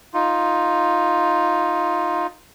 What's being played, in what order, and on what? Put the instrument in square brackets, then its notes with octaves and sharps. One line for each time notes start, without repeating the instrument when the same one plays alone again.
[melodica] D#4 F4